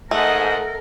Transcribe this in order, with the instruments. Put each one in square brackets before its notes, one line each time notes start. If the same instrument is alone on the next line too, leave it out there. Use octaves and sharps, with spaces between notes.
[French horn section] G#2 [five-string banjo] A3 [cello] A4 A#4 [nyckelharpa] D#5 F#5